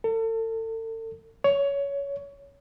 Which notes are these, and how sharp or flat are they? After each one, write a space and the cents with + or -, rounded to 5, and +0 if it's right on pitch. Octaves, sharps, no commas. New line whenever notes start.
A4 +40
C#5 +20